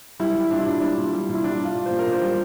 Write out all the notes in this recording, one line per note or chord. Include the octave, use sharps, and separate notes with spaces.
G3 E4
G3
A#2 D4
E4
A#2 D4
G3 D4
A#2
G3
A#2
E4
G3 D4
A#2
F4
A#2
A#2 C5
A#4
A#2
C5
G3